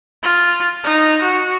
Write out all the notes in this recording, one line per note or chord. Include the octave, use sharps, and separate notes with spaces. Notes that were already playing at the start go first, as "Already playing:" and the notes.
F4
D#4
F#4